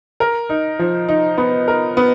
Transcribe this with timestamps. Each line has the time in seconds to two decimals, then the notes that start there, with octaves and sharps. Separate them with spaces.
0.20 A#4
0.49 D#4
0.79 F3
1.08 D#4
1.38 B3
1.68 A#4
1.97 B3